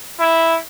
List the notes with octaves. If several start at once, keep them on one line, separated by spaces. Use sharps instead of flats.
E4